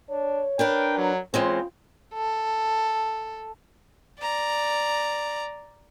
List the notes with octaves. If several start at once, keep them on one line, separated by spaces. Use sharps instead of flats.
D4 C#5
D4 A#4 B4 G5
F#3
E3 G#3 C4 C#4 F4
A4
D5 A#5